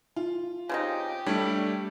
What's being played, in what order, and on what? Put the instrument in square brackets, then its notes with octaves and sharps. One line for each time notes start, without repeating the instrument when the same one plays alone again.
[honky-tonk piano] F4
[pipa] C#3 C4 D#4 [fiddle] G4
[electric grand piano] G3 A3 [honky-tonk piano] D4 [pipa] C#5